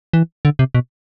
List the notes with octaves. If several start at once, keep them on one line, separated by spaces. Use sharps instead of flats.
E3
D3
C3
B2